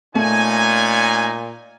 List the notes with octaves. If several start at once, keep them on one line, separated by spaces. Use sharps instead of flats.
A#2 A3 C#4 D#4 G#5